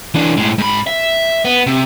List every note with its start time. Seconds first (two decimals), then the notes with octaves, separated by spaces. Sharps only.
0.14 E3 D4
0.37 A2 G#3
0.58 G#2 B5
0.87 E5
1.45 B3
1.67 C3